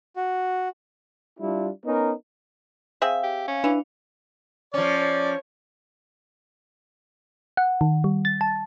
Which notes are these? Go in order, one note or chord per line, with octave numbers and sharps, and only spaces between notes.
F#4
G3 D4 E4 F4
B3 C#4 D#4 A#4
C4 G#4 E5 F5
G4
C#4
E3 D4
F3 C#4 C#5 D5
C#5
F#5
D#3
G3
A6
A5